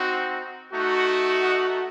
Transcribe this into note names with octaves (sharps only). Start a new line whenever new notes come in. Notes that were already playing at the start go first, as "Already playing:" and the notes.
Already playing: C4 D#4 F#4
A3 D#4 F#4
D#5 F#5